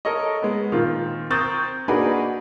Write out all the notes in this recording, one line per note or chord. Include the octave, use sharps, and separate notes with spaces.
A4 A#4 C#5 D#5
G#3 B3
A#2 D#3 C4 F4
C4 A#4 C#6 D#6 G6 A6
A#3 D4 D#4 F#4 G#4 B4